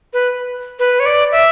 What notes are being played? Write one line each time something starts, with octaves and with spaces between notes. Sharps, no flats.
B4
B4
C#5
D5
E5